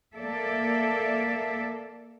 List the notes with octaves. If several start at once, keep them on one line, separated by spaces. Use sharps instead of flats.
A#3 A4 D5 E5